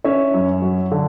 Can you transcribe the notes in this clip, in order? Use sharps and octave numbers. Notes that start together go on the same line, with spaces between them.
C#4 C#5 E5
F#2
F#3
D3